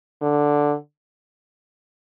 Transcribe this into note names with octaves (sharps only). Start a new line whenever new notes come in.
D3